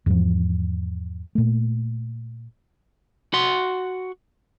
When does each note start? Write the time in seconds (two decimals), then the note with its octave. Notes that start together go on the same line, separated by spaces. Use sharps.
0.06 E2 G#2 F3
1.35 A#2 A3
3.33 F#4 F#5 C6